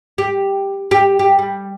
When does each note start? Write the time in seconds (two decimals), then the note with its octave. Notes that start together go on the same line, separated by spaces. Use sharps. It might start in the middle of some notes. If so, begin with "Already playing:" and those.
0.18 G4
0.91 G4
1.19 G4
1.39 G3